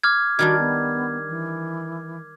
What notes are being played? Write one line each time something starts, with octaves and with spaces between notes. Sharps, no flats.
D6 F6 G#6
D#3 G3 D4 F#4 G#6
B3
E3